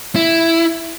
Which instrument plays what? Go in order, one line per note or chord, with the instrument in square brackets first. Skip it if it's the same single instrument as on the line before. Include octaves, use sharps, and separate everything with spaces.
[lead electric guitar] E4